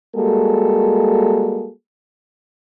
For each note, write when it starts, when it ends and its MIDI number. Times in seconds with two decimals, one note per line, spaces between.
0.16 1.70 55
0.16 1.70 56
0.16 1.70 58
0.16 1.70 66
0.16 1.70 68
0.16 1.70 69